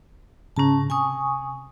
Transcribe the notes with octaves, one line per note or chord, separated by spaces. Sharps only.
G#2 C#3 C#4 A5 A#5
C3 G#5 C#6 D#6